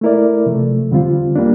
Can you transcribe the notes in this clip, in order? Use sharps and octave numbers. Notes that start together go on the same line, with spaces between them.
A3 E4 A#4 D5
C3 F3 A3
E2 D3 G3 C4 F4
G3 A#3 D4